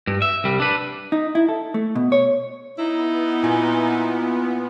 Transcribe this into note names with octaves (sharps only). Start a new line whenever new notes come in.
G2
E5
C2 G3
D4 B4
D#4
E4
A4
A3
B2
C#5
B3 D#4 E4
A#2 G#5